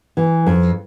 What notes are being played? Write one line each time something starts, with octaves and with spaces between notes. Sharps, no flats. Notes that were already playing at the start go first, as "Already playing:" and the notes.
E3
F2